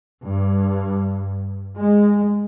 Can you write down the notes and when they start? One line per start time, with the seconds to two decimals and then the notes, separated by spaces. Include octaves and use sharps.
0.24 G2
1.77 G#3